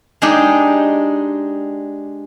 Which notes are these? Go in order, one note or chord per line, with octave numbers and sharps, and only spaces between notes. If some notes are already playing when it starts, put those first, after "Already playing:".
G#3 D4 D#4 G4